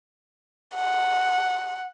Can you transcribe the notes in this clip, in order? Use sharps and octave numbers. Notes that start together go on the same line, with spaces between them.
F#5